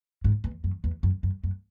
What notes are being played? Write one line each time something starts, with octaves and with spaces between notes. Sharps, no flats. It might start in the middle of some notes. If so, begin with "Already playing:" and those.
G#2
E2
F#2
E2
F#2
F#2
F#2